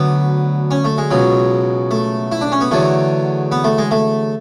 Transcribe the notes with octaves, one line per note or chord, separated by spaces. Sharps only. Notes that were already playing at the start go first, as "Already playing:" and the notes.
Already playing: D2 D3 F#3 B3
C#4
A3
G#3
C#2 B2 F#3
A3
E4
D4
C#4
B3
E2 D3 F#3 A3
B3
A3
G#3
A3